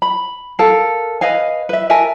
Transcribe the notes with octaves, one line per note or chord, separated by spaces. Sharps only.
B5
A4 A#4 F5
B4 D#5 F5 G#5
B4 E5
A#4 E5 G#5 A5